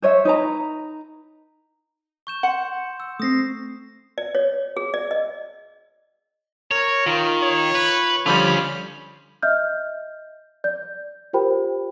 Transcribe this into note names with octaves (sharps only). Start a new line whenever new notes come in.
C5 C#5 D#5 E5
D#4 B4 A#5
C#6 G6 E7
F#5 C6 C#7
E6
A3 C4 D#6 A#6 C7
D5
C#5
G#4
D5
D#5
A#4 C#5
D#3 F4
C#5
B4
D3 F3 G3 C#4 F4 B5
D#5 E5 F6 G6
D5 G6
F4 G4 A#4 C5 G5 B5